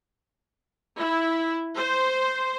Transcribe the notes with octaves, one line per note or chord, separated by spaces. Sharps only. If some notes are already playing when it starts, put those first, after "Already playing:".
E4
C5